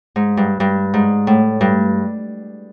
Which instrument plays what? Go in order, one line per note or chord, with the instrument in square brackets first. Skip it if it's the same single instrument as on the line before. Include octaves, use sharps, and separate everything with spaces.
[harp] G#2
G2
G2
G#2
A2
G2